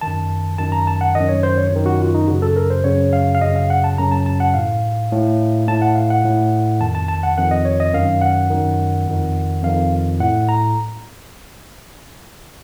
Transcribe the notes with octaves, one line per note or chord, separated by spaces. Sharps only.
F#2 D#3 A5
F#2 D#3 A5
A#5
A5
F#5
F#2 D#3 D#5
C#5
C5
C#5
F#2 D#3
F#4
F4
D#4
F#2 C#3 F#4
A4
A#4
C5
F#2 C#3 C#5
F5
F5
F#2 C#3 D#5
F5
F#5
A5
F#2 C#3 A#5
A5
A5
F#5
A2 F5
A2
A2 A5
F#5
F5
F#5
A2
F2 D#3 A5
A5
A5
F#5
F2 D#3 F#5
D#5
C#5
D#5
F#2 D#3 F5
F#5
F#2 D#3
F2 D#3
F2 D#3 F5
A2 F#5
A#5